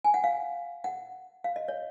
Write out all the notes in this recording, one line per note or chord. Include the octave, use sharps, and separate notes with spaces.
G#5
F#5
F5
F#5
F5
D#5
C#5